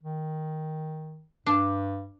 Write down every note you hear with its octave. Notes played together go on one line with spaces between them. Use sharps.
D#3
G2 D4